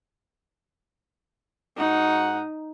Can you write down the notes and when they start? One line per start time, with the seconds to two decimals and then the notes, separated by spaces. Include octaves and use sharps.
1.77 G#2 D#4 F#4 F#5